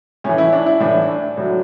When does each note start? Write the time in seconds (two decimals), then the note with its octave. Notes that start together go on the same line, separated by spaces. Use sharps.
0.24 A2 E3 C#4
0.38 E4
0.53 D4
0.66 E4
0.80 A2 E3 D4
1.37 A2 F#3